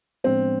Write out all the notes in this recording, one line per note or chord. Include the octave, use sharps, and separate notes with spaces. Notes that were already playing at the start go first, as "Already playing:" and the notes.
A2 F3 G#3 B3 C4 D4